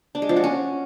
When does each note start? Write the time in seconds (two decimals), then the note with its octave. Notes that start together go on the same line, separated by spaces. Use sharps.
0.15 D4
0.22 G#3
0.29 F3
0.36 F#4
0.44 C#4